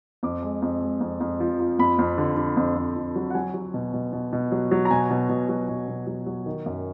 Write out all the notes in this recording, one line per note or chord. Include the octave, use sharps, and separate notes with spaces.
F2 D6
G#3
F2
G#3
F2
F2
F3
F3
F2 B5
F2
D3
D3
F2
F2
F2
F#3
F#5
F#3 G#5
F#3
B2
B2
B2
B2
F#3
F#3
A#5
B2 G#5
B2
B2
F#3
B2
B2
F#3
F#3
D#3
F#2